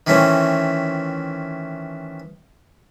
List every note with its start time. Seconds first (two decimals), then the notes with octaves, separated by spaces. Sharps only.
0.07 D#3 E3 A3 C4 C#4